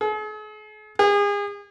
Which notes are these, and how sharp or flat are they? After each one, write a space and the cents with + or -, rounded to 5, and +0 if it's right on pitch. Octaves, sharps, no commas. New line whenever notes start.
G#4 +45
G#4 -35